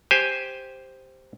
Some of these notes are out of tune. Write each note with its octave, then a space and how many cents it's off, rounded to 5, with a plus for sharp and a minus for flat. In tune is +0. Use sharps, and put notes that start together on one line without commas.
G4 +0 C5 +0 G#5 +0